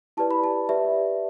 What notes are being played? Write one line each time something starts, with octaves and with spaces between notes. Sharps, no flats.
E4 G4 B4 D5 A5
B5
A5
G4 B4 D5 E5